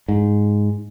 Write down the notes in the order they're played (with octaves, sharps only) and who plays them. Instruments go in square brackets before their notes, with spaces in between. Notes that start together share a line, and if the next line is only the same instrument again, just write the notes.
[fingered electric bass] G#2